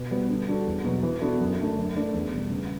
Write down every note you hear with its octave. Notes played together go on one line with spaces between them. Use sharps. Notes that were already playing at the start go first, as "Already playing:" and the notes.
Already playing: B2
G3 B3 F#4 B4
D3
G3 D4 F#4 A4
E2
B2 F#3
E3
B3 D4 F#4 A4
F#2
D3 A3 D4
F#2
E3 A3 D4
E2
B2 G3
C#3